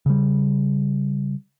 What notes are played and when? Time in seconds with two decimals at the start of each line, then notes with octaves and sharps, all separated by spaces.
0.06 C#3 G3